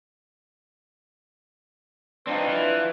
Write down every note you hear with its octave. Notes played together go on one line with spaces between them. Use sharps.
C4 D4 D#4 F4 B4
E3